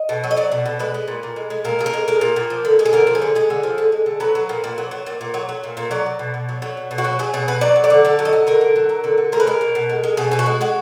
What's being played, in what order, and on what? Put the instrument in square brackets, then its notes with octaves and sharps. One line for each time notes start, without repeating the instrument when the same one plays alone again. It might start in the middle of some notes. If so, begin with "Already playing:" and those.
Already playing: [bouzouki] D#5
B2
F#3
D#5
F#3 D5
B2
B2
G#3 B4
G#3
A#2
A#2
G#3
G#3
A#2 A#4
A#2 G#4
A#4
G#3
G#3 A#4
A#2
A#2
F3
D3
G#3
G#4
D3 A#4
F3
G#4
D3
G#3 G#4
D3
F3
D3
G#3
D3
F#3 B4
F#3
A#2
A#2
F#3
F#3
A#2
A#2
F#3
F#3
A#2
A#2
F#3 D5
F#3
B2
B2
F#3
F#3
B2
B2
F#4
F#3
F#3 G#4
B2 G#4
B2 B4
F#3 D5
F#3
D5
D3
D3 D5
F#3
D#5
F#3
D3 A#4
D3
F#3
F#3
D3
D3
G#3 A#4
B4
G#3 A#4
B2
B2
G#3
G#3
B2 G#4
B2 G#4
F#4
G#3
G#3 F#4